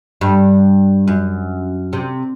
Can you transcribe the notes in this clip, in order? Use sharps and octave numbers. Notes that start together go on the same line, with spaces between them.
G2
F#2
C3